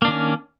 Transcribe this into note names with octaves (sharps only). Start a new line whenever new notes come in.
D#3 A#3 C#4 D4